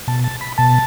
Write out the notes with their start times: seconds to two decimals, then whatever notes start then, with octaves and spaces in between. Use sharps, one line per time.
0.07 B2 A5
0.24 A5
0.41 B5
0.58 B2 A5